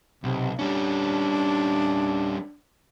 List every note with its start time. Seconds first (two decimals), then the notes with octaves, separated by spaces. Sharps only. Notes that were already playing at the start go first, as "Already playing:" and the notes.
0.24 B1 C3
0.59 G3 C#4 D4